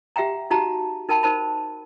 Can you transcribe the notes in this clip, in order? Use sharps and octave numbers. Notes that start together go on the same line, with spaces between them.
G4 E5 F#5 G5 A#5
D#4 F#4 G4 F#5 A5 A#5
D#4 A#4 G5 A5 B5
D#4 A#4 C5 A5 B5